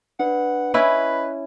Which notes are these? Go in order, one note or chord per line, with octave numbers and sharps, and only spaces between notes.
D4 B4 F#5
C#4 E4 B4 D#5